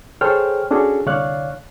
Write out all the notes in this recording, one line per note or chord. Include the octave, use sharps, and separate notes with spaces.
G#4 A4 C5 C#5 G5 F6
C#4 D4 F#4 G#4 A4
C2 D3 C#5 D5 F5 F#6